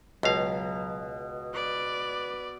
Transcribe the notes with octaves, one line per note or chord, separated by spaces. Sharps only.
C#2 B2 F#3 F5
B4 D5